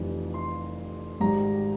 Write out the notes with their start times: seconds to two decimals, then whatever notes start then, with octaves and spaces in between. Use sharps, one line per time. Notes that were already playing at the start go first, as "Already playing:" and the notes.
Already playing: F1 F2 E3 G3
0.34 C6
1.20 G#1 G#2 G3 A#5